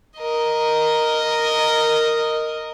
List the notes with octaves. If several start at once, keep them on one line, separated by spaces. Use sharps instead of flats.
A#4 D#5